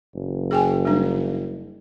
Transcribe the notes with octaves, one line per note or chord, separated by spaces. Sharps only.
F#1
G#4 G5 G#5
G3 D4